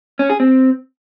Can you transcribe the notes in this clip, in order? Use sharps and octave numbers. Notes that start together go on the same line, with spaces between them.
C#4
G#4
C4